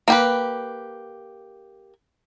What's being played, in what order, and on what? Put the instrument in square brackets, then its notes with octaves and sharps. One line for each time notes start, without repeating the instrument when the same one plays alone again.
[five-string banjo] A#3 G4 B4